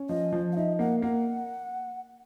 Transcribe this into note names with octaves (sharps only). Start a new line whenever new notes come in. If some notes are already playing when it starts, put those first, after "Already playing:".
Already playing: C#4
F3 D#5
F3
F5
D#4 E5
A#3 F#5
A#3 F#5